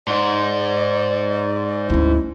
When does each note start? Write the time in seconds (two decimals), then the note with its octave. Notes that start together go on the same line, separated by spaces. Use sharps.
0.07 G#2 D5
1.90 D2 C#4 E4